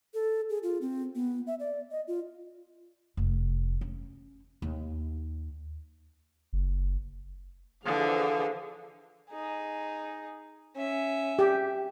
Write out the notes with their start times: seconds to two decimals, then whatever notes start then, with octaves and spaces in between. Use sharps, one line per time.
0.14 A4
0.50 G#4
0.63 F4
0.81 C4
1.15 B3
1.47 E5
1.60 D5
1.91 D#5
2.08 F4
3.17 F1
3.81 C#4
4.62 D#2
6.53 F#1
7.85 D3 E3 F3 G#4 F5
9.30 D#4 G#4
10.76 C#4 E5
11.39 G4